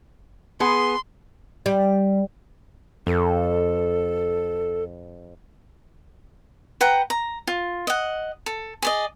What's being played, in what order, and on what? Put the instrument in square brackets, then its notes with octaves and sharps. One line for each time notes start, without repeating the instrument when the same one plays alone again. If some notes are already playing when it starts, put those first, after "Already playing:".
[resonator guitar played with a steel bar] B3 G#4 [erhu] C6
[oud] G3
[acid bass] F2 [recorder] A4
[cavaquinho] B4 F#5 G5 A#5
A#5
F4
D#5 F#5
A4
G#4 D5 D#5